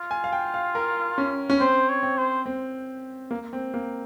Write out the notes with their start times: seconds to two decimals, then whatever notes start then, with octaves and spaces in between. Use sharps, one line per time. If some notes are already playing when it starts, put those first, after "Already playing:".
Already playing: F4
0.11 G#5
0.24 F5
0.32 G5
0.54 F5
0.75 A#4
1.18 C#4
1.50 C#4
1.60 C4 C5
1.89 C#5
2.03 C4
2.18 C5
2.46 C4
3.31 A#3
3.53 C4
3.74 A#3